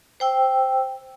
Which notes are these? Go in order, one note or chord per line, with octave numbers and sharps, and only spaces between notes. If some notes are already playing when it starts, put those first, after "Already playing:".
C5 G5 E6